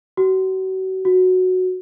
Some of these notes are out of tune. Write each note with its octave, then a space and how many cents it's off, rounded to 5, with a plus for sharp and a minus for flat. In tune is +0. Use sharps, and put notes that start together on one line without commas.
F#4 +35
F#4 -5